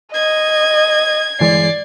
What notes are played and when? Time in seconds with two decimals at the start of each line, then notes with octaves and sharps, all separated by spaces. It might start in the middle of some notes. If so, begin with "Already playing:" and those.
0.14 D#5 G#6
1.40 G1 E3 G#3 D5 C7